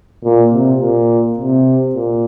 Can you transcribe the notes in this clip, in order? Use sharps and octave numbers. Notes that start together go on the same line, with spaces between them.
A#2
C3
A#2
C3
A#2